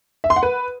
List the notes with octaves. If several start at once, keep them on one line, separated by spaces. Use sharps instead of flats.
E5
C6
F#5
B4